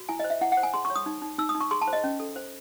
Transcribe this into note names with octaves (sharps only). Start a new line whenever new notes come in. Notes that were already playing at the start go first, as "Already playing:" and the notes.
Already playing: F#4
E4 G#5
C5 D#5
E5
E4 F#5
F#5
C5
G#5
G#4 C6
C#6
C#5
D#6
D#4
D#4
D#4 E6
D#6
D#4
C#6
G#4 C6
A5
C5
D#5
C#4
A4
C5